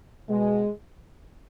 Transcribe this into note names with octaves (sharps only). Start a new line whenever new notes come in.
B2 G#3